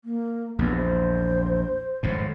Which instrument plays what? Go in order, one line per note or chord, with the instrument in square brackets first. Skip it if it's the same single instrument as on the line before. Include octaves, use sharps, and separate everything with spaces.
[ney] A#3
[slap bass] A#1 E2 [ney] B3
[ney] C5
[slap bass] G#1 F2 A2